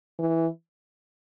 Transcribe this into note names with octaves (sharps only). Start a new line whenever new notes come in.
E3